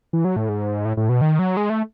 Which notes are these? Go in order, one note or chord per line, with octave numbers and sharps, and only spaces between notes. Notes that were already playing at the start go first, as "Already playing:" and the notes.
E3
F#3
A2
G#2
A2
A2
B2
D#3
F#3
G#3
A3